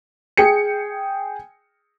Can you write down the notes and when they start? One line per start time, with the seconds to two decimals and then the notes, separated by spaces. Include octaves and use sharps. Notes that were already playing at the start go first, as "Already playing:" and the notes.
0.37 G#4 G5 C#7